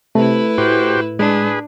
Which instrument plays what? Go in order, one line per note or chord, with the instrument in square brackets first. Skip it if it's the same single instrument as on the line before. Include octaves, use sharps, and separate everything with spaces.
[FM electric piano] C3 [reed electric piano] A3 A4 [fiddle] E4 B4
[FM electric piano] A2 [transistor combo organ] F#4 G4 C5
[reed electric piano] G#3 [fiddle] D4 [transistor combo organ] G#4 B4